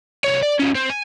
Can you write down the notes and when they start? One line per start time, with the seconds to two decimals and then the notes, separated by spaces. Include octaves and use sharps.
0.24 C2 C#5
0.43 D5
0.60 F3 C#4
0.75 C4
0.90 G#5